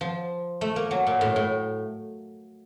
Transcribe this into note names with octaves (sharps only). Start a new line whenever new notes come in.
F3
A3
A#3
F#3
A#2
A2
A2